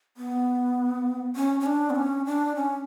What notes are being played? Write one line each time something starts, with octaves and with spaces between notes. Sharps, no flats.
B3
C#4
C#4
D4
B3
C#4
D4
C#4